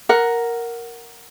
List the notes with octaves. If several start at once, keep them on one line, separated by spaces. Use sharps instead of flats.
A#4 F#5